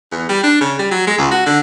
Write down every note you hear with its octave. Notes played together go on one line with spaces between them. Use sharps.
E2
G3
D4
C#3
G3
F#3
G#3
C#2
F#4
D3